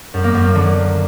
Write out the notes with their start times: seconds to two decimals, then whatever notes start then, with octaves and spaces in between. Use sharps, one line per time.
0.14 F#2
0.24 A#3
0.34 F#2
0.44 A#3
0.55 D3